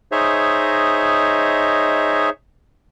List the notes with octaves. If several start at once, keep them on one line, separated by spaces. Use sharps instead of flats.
D#4 G#4 C5 C#5 D#5 E5